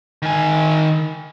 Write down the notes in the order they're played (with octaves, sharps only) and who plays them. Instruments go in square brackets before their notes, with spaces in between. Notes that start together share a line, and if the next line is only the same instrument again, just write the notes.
[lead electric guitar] D#3 G#5